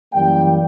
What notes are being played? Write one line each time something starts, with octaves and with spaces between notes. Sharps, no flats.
F#2 E3 G3 A#3 G5